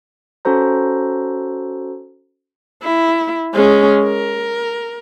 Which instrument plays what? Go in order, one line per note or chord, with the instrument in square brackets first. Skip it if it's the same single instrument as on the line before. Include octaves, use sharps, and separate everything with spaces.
[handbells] C#4 F#4 A4 C5 A#5
[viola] E4
G#3 C#4
A#4